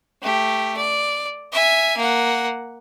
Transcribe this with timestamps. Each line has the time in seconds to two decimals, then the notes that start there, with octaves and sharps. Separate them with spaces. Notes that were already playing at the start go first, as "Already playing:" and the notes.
0.22 A3 G4
0.76 D5
1.52 E5 G#5
1.97 A#3 F#5